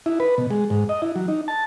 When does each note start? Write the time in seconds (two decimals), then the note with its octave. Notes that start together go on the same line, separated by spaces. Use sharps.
0.06 E4
0.20 B4
0.38 B2
0.51 G#3
0.70 G#2
0.89 D#5
1.02 E4
1.16 F#3
1.28 D#4
1.48 A5